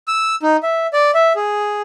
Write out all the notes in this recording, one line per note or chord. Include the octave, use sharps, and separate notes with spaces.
E6
D#4
E5
D5
E5
G#4